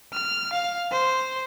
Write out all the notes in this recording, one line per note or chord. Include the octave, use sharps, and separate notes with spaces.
F6
F5
C5